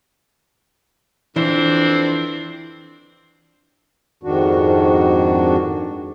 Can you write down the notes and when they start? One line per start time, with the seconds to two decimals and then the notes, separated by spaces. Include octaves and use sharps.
1.36 F2 E3 C4 D4
4.23 F2 G#2 D#3 D4 F#4